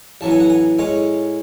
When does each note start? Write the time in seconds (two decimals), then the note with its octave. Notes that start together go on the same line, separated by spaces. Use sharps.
0.21 A1 A2 F#3 B3 A5
0.31 G#5
0.40 F#5
0.50 G#5
0.79 A2 G#3 C#4 G#5